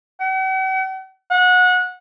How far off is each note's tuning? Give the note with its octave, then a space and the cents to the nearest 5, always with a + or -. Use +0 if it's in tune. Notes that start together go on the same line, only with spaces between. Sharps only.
F#5 +45
F#5 -25